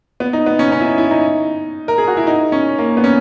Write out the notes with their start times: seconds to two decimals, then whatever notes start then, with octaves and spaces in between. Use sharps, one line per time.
0.20 B3
0.33 D#4
0.46 B3
0.59 C#4
0.72 C#4
0.80 E4
0.85 D#4
0.98 E4
1.11 D#4
1.88 A#4
1.98 G#4
2.08 F#4
2.17 E4
2.27 D#4
2.52 C#4
2.78 A#3
2.97 B3
3.04 C#4